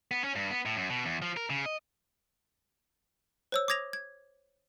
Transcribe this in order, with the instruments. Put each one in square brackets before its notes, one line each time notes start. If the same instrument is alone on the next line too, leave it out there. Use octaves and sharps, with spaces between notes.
[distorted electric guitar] B3
C#4
G2
B3
A2
F#2
B2
E2
F3
A#4
C#3
D#5
[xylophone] C5 C#5 E6
D6 D#6 G#6 A#6 F7
G#6